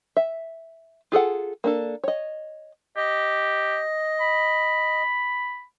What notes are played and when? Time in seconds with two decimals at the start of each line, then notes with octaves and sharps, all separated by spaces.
0.17 E5
1.12 F4 G#4 A4 F#5
1.64 A#3 D4 A4
2.04 C#5 D#5
2.97 G4 D#5
4.21 B5